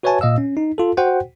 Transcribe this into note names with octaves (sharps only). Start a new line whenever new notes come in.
F#4 B4 C#5 E5 G#5 A5
A#2 D#5 F5 E6
C#4
D#4
F4 A4
F#4 C5 F#5 G5